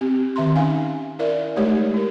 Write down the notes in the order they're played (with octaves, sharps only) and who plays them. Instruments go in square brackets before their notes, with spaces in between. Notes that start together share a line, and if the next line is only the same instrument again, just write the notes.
[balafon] C4 G4
D#3 E5 A#5 C6
C#4 D#4 F5 G#5
E4 A#4 D5 E5
G#3 A3 D#4 G4 C#5
E4 A#4